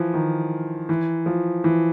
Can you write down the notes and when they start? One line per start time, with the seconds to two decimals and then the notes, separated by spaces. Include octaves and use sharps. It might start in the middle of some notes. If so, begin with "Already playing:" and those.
Already playing: E3 F3
0.14 D#3
0.89 E3
1.26 F3
1.64 E3